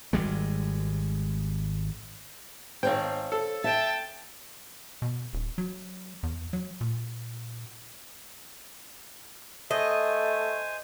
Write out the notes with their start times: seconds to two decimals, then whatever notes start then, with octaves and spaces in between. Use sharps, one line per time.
0.13 G#1 G3 G#3
2.83 G#1 C5 C#5 F5 G5
3.32 A4
3.64 E5 G5 A5
5.02 B2
5.33 D#1
5.58 F#3
6.23 E2
6.53 F#3
6.81 A#2
9.71 A3 C5 D#5 G#5